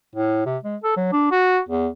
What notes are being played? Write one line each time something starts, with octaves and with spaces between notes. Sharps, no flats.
A2
C3
G#3
A4
F#3
D4
F#4
E2